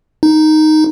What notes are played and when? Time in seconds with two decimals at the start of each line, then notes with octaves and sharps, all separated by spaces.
0.23 D#4